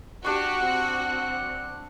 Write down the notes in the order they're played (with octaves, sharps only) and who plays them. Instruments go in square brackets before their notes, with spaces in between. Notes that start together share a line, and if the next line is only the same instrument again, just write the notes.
[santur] D4 C#6 [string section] F#4 [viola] G4 [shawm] F#5
[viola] C4